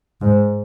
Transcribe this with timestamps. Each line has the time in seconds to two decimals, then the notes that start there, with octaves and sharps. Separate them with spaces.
0.21 G#2